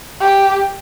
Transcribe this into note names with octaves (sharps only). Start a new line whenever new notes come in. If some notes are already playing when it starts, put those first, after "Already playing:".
G4